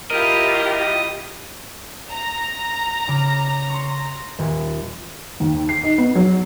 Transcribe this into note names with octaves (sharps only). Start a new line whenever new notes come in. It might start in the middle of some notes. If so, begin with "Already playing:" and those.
E4 F4 G4 A#4 D#5
A#5
C#3 D6
C6 C#6
D#1
D#2
C7
D#4
B3
F#3